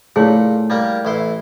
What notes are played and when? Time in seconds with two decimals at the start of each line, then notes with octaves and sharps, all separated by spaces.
0.16 A#2 A3 E4 G#4 C#5
0.70 G3 A#3 G4 G#6
1.05 A1 E4 C6